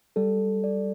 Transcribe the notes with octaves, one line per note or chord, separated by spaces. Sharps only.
G3 A4
D5